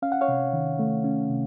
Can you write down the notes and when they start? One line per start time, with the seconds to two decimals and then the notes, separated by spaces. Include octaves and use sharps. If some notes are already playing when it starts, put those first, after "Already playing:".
0.02 C#4 F5
0.12 F#5
0.21 C#5 F5
0.28 C3
0.53 D#3
0.79 A3
1.04 C#4
1.29 C3